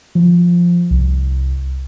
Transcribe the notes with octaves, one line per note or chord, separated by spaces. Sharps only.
F3
C2